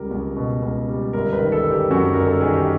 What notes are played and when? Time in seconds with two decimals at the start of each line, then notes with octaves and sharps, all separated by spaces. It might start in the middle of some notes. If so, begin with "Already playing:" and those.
Already playing: C#2 G3 A#4
0.11 C#2
0.36 B2
0.62 C#2
0.89 G3
1.13 G1 A#4
1.33 B4
1.39 D#3
1.52 A4
1.64 G1
1.71 G4
1.91 F#2 F#4
2.14 G1 A#4
2.26 A4
2.41 D#3 G#4
2.53 G4